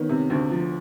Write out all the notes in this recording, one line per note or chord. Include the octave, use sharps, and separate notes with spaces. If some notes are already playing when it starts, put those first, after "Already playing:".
Already playing: D#3 B3 C#4
C3
D2
F3